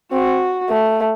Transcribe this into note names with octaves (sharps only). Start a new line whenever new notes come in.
C4 F#4
A3